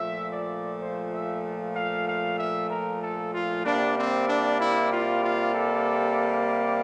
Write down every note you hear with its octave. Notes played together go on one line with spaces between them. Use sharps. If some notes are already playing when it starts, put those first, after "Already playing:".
Already playing: A#2 F3 A3 E5
D5
C5
E5
F5
F5
E5
A#4
A4
F4
C3 G3 A#3 D4
C4
D4
E4
F4
F4
A4